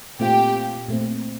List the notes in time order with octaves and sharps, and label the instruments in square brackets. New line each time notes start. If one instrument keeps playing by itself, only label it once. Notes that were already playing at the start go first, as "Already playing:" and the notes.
[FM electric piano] A#2 A3 C4 F4 [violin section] G4
[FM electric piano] A#2 A3 C4